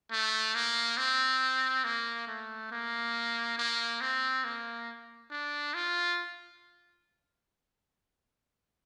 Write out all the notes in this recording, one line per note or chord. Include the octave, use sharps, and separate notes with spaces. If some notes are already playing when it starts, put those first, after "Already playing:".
A3
A#3
C4
A#3
A3
A#3
A#3
C4
A#3
D4
F4